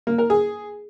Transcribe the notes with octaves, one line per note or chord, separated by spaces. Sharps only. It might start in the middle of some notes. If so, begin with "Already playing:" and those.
A#3
A#4
G#4